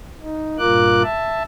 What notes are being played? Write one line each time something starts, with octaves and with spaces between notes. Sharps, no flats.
D#4
G2 A#2 F4 A#4 D6 F#6
E5 A5